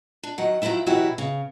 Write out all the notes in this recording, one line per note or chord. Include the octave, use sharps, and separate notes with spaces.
D4
D#3 F#3 F#5
D#3 F3 F#3 E4 E5
F#2 B2 E3 E4 F#4 G4
C#3